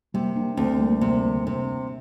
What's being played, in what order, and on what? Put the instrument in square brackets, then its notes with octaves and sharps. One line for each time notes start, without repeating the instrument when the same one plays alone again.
[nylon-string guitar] C3 [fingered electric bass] G3 A#3
[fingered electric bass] A#3 D4
[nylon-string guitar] D2 [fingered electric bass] A3 C4
[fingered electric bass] G3 A#3
[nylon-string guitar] C3 [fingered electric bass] G3 A#3
[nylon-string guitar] C3